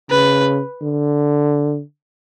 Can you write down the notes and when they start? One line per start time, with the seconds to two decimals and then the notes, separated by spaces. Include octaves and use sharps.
0.11 C#3 B4
0.82 D3